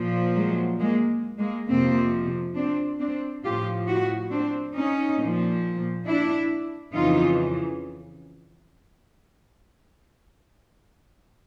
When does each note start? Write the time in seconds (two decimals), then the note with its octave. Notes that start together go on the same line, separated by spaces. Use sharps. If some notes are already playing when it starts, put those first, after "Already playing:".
Already playing: A#2 F3
0.36 F#3 G#3
0.80 G#3 A#3
1.38 G#3 A#3
1.68 F2 C3 F3 A#3 C4
2.55 C4 D4
2.99 C4 D4
3.44 A2 F3 F4 G4
3.87 E4 F#4
4.31 C4 D4
4.75 C#4 D#4
5.18 A#2
5.23 F3
6.06 D4 E4
6.94 F2 C#3 E3 D#4 F4